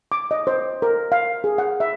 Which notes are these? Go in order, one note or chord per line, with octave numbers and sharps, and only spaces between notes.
D6
D#5
C5
A#4
F5
G#4
F#5
E5